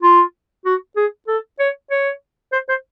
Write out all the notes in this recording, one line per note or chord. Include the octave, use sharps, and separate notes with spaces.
F4
F#4
G#4
A4
C#5
C#5
C5
C5